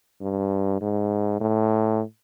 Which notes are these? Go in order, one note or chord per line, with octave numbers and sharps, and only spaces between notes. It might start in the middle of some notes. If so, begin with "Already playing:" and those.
G2
G#2
A2